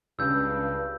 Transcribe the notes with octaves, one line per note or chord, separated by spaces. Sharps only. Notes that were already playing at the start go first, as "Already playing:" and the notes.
C#2 G2 C#3 E6 G6